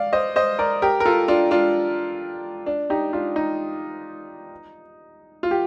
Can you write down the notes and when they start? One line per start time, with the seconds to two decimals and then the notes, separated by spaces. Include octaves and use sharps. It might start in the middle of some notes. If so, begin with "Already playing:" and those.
Already playing: D5 F5
0.13 C5 D#5
0.36 C5 D#5
0.59 A#4 D5
0.82 G4 A#4
1.00 A#4
1.05 F4 A4
1.28 D4 F4
1.51 D4 F4
2.66 D4
2.90 D#4 G4
3.13 D4 F4
3.36 D#4
5.43 F4
5.51 G4